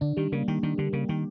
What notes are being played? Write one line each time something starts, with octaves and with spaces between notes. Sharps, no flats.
D3 D4
D#3 G3
C#3 A#3
D#3 G4
D#3 D4
D3 G3
C#3 A#3
D#3 G4